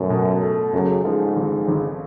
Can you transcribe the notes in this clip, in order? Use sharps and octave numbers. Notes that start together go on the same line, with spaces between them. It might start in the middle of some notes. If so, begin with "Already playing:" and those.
Already playing: F#2 B2 A3
B2
A3
F#2 C#3
G#2 F3
G#1
G#1